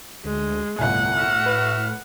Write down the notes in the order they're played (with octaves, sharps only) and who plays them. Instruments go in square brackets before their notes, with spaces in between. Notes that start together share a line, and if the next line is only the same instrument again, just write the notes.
[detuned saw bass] D2 [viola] G#3
[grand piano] G1 C2 G#5 [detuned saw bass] A2 [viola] F#5
[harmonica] F#4 E5 F6
[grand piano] B4